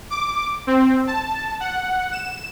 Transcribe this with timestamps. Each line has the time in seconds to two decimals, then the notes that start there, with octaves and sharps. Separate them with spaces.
0.10 D6
0.67 C4
1.07 A5
1.60 F#5
2.12 E7